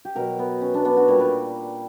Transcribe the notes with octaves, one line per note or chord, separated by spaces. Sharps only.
G4
B2 F#3 F#4 A#4
B3
C#4
B3 D4
B3 D4
D4 F#4
A#2 G3 A#4 C#5
B4 D5